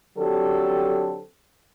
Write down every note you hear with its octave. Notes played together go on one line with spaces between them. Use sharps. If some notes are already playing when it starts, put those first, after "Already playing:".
D3 F#3 C4 G4 A4